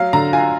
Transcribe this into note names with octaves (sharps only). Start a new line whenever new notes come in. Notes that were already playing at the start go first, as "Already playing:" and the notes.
Already playing: F#3 F5
D3 A#5
F4 G#5